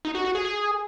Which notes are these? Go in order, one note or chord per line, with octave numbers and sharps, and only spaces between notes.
D#4
F#4
F#4
G#4
G#4